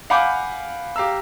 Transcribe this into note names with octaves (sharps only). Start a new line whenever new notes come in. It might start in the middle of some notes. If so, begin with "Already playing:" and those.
F5 F#5 G#5 B5 D6 G6
G4 F5 A#5 E6